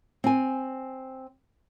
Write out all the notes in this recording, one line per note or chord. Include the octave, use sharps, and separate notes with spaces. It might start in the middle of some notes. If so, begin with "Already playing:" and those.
C4 G#5